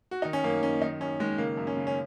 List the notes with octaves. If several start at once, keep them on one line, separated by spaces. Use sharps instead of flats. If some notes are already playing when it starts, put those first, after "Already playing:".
F#4
D#3 D#4
C#4
F#2 A#3
F#2 C#4
D#3 D#4
F#2 C#4
D#3 G#3
C#3 A#3
F#2
C#4
C#3
C#4